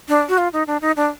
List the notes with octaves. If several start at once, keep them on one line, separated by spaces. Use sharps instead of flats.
D4
F#4
F4
D#4
D4
D#4
D4